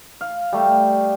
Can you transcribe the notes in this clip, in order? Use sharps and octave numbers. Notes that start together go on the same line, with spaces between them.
F5
G3 A3